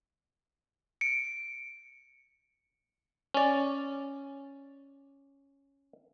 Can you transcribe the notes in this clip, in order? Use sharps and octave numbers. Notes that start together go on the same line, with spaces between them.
C#7 D7
C#4 D5